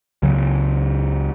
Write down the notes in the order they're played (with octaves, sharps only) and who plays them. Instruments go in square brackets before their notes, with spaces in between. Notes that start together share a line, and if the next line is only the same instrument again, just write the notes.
[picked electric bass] C#2 C#3 F#3